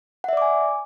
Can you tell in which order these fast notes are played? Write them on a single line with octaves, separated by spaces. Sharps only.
F#5 E5 D5 D6 G#5